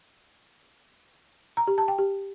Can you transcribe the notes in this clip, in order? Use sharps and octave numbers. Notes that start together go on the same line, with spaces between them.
A#5
G4
A5
G5
G4